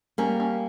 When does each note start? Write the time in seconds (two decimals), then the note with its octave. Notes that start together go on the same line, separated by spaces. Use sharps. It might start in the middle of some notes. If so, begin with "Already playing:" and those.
0.18 G3 A#3 C#4
0.40 C#4